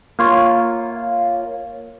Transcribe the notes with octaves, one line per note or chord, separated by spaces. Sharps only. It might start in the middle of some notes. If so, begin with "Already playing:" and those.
A#3 F4 C#5